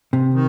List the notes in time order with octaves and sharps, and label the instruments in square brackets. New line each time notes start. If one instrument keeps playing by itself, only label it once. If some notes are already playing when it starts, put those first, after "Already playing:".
[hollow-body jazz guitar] C3
[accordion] D#3